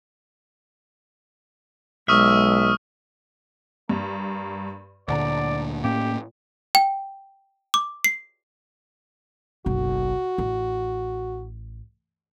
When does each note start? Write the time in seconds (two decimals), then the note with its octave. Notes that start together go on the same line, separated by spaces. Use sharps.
2.08 B1 G#3 E5 C#6 D#6 F6
3.89 G2 A#3
5.08 D2 A#2 D3 D5 F#5 A5 A#5
5.84 A2 A#3 C#4 G4
6.75 G5
7.74 D6
8.04 C7
9.66 F#1 B1 F#4
10.38 A1